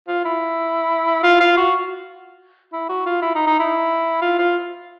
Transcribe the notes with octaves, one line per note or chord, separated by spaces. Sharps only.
F4
E4
F4
F4
F#4
E4
F#4
F4
E4
D#4
D#4
E4
F4
F4